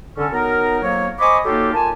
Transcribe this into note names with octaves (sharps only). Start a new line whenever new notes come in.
D3 C#4 A4
F#3 B3 D#4 A#4
F2 F#3 A#3 C#5
C5 D#5 G#5 B5 C#6 D6
F#3 A#3 D#4 F4 G4 A4
A#3 F4 G#5 A5